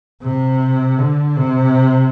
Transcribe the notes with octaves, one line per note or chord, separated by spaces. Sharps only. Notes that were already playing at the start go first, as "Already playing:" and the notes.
C3
D3
C3